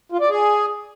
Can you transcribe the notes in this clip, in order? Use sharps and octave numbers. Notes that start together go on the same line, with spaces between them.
F4
D5
G#4